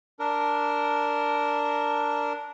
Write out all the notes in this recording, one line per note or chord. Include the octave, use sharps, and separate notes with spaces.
D4 A#4